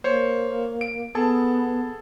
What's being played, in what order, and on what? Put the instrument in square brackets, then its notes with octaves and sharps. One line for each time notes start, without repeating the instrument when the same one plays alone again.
[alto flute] A#3 [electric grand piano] C5 C#5
[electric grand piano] D7
[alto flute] B3 [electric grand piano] G#4 A4 A5